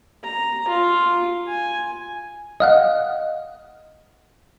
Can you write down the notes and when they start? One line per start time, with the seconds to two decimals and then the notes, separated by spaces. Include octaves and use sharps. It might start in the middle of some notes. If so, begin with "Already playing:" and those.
0.24 A#5
0.68 F4
1.47 G#5
2.60 D#5 F5 F#5